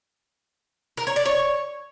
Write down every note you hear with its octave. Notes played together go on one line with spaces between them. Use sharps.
A#4
C#5
D5
C#5